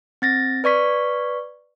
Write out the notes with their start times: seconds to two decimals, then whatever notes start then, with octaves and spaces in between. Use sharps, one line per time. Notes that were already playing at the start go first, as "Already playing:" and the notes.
0.22 C4 A6 A#6
0.64 B4 D5 C#6 B6